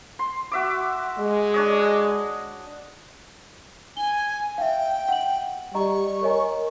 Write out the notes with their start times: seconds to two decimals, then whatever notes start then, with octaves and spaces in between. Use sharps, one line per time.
0.19 C6
0.52 F#4 E5 D6
1.18 G#3
1.54 D4 C#5 D#5
3.97 G#5 G7
4.58 E5 F5 G5
5.08 F#5 F#7
5.75 G3 D#5 A#5 C#6
6.23 A#4 C#5 D#5 G#5